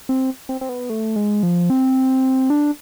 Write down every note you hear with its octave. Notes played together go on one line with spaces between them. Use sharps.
C4
C4
C4
B3
A3
G#3
F3
C4
D4